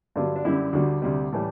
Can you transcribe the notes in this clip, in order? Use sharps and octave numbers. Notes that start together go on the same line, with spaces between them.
G2 D3 F#3
D4
F#2 D3 G3 E4
D2 D3 G3 F#4
D2 C3 G3
A2 E3 G3